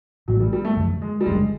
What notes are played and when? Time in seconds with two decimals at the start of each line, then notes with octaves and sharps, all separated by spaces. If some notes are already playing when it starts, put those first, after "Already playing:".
0.28 A1 A2 E3 F#3 A3
0.40 G3
0.53 G3
0.65 A3
0.77 F#2 D3 F3
1.02 G#3
1.21 G3
1.26 F#1 F#2 D3 G#3